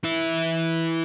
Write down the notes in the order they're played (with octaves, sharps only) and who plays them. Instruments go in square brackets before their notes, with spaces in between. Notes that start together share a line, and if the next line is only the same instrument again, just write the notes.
[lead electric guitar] E3 E4